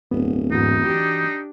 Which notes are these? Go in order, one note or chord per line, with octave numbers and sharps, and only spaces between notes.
D1 C2 G2 B3
E2 G#2 E3 D#4 F#4
D4 G4